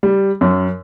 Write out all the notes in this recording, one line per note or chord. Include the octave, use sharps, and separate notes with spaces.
G3
F#2